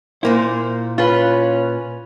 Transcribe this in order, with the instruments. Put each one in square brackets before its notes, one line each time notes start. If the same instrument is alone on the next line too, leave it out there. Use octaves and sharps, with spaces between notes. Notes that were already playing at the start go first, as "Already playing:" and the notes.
[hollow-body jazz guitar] A#2 A#3 E4 [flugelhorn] C5
[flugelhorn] C#4 [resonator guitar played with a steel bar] F4 B4